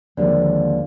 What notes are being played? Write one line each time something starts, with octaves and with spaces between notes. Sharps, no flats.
D#2 D3 F3 G#3